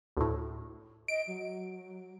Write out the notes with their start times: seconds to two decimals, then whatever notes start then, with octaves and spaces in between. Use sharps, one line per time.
0.17 D2 A2
1.08 D#5 D7
1.27 F#3